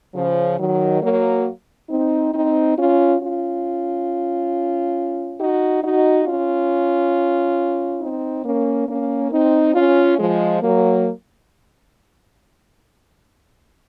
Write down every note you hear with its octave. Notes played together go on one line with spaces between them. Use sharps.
C#3 F3
D#3 F#3
F#3 A#3
C4 D#4
C4 D#4
C#4 F4
C#4 F4
D#4 F#4
D#4 F#4
C#4 F4
C4 D#4
A#3 C#4
A#3 C#4
C4 D#4
C#4 F4
F3 G#3
F#3 A#3